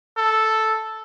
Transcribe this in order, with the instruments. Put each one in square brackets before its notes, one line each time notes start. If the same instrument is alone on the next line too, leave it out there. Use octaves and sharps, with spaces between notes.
[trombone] A4